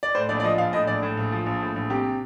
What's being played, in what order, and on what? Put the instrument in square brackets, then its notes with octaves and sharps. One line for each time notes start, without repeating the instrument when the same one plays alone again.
[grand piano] D5
A2 C5
A#1 D5
D5
F3 D#5
A#1 F5
A2 D#5
A#1 D5
A2
A#1
F3
A#1
A2
A#1
C3 G4